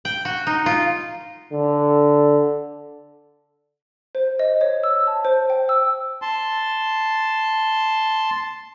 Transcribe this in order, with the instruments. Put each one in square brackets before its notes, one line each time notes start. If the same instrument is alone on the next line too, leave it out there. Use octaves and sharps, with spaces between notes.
[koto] G5
F#4
D#4
F4
[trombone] D3
[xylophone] C5
D#5
C#5
E6
A5
C5
G5
E6
[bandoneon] A5 C6